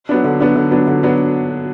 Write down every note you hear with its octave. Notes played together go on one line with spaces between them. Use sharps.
F#3 B3 D4
D3
F#3 B3 D4
D3
F#3 B3 D4
D3
F#3 B3 D4